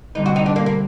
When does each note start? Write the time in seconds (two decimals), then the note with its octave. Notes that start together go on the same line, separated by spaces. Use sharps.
0.15 D3 G3 C4 D#4
0.26 F#4
0.36 D#4
0.46 D4
0.56 A#3
0.66 A#3